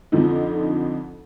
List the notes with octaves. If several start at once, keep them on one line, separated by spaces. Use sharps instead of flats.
F2 D3 F3 D#4